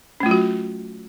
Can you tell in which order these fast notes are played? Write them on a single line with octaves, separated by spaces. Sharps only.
C#4 A3 F4 F#3 F#4